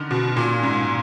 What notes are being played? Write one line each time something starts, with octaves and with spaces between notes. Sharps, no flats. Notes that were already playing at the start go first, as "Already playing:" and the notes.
Already playing: D3 D#3
B2
A#2
G#2